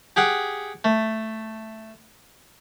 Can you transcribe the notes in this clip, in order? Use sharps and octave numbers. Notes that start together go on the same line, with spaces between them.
G4 G#4 F#5 G5
A3